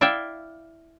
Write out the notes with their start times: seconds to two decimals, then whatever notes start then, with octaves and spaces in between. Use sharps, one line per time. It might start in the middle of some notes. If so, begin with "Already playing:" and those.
0.01 E4 D5 E5 F5 G5